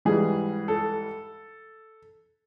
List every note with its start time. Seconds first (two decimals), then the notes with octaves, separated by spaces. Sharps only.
0.05 G#2 E3 G3 G#4
0.68 A4